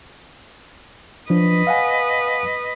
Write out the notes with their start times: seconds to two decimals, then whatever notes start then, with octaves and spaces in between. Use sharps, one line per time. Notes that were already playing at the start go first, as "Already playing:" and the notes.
1.30 F3 D4 B4 D#5
1.67 F5 F#5 G#5